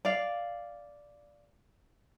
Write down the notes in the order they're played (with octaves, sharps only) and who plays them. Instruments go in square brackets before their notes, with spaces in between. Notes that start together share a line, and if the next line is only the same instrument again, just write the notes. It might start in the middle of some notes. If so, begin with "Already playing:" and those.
[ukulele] D5 F5